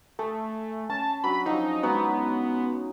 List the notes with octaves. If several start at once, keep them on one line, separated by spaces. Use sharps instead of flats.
A3 G#4
C#4 A5
F#3 D4 B5
F3 F#3 C#4 D#4
F#3 G#3 B3 D#4